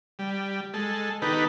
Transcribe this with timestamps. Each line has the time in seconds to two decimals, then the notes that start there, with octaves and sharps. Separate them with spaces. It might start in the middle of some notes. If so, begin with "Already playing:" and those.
0.19 G3
0.74 G#3 A4
1.22 D#3 B3 D#4 G4 A4 B4